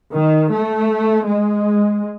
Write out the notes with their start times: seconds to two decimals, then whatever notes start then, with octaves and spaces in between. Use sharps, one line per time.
0.14 D#3
0.51 A3
1.26 G#3